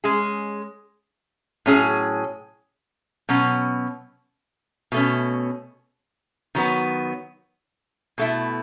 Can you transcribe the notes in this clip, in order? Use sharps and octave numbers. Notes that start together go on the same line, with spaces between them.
G#3 C#4 G#4
A2 F#3 C#4 G#4
B2 F#3 C#4
B2 A3 C#4
D#3 F#3 B3
B2 A3 E4